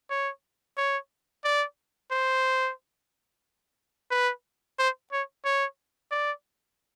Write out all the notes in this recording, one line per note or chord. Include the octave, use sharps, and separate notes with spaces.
C#5
C#5
D5
C5
B4
C5
C#5
C#5
D5